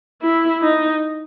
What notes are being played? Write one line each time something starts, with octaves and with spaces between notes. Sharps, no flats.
E4
D#4